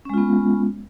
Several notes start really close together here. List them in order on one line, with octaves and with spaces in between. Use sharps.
C#4 G#3 F4 B3